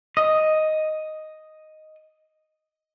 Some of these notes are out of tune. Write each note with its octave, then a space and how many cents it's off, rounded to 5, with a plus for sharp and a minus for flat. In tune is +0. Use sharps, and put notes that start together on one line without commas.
D#5 +0